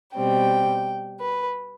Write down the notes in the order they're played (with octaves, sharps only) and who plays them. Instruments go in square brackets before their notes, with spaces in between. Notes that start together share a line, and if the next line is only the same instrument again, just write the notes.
[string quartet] B2 G3 C4 G5
B4